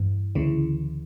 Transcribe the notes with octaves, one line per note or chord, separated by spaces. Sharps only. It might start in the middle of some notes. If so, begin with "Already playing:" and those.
Already playing: G2 E3
D2 C#3 E3